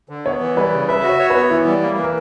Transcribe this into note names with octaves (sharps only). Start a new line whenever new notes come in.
D3
B3 C#5
E3
G3 B4
C#3
B4 E5
F#4
C#5
C#5
B4
B3
E3 E4
G3
A#3
E3
A#4